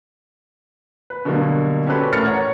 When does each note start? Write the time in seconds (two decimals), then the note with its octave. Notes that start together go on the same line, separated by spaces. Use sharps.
1.10 B4
1.25 B2 D3 F#3 G3 A#3
1.86 C#4 F#4 G4 A4 B4 C5
2.12 A1 A2 A#4 F6 A6 C#7
2.25 C#5 F#5 A#5